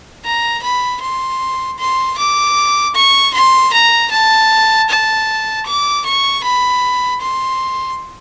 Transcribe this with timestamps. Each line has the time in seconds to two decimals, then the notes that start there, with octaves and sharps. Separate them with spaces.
0.24 A#5
0.62 B5
1.01 C6
1.78 C6
2.17 D6
2.95 C#6
3.34 C6
3.73 A#5
4.11 A5
4.89 A5
5.66 D6
6.05 C#6
6.43 B5
7.21 C6